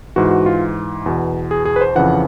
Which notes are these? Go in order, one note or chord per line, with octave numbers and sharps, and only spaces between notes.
G#2 E3 F#4
F#4
F4
E2 B2
G#4
G#4
B4
C5
F2 C#3 E3 F#5